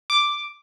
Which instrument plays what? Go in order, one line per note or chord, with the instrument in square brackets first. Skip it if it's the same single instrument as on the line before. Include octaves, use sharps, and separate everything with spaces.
[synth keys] D6